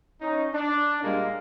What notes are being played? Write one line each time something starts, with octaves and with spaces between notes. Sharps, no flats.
C#4 D#4
D4
A#2 G3 G#3 A#3